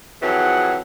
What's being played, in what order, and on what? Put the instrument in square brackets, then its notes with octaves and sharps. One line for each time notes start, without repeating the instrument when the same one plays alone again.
[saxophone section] F2 E3 F#3 [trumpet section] G#4 F#5